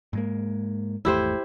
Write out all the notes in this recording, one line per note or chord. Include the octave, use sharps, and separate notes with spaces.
G#2 G#3 A#3
G#1 E2 A3 E4 G4 C5